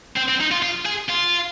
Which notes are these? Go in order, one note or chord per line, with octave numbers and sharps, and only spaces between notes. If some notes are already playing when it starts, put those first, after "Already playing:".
C4
C4
D#4
F4
F4
G#4
F4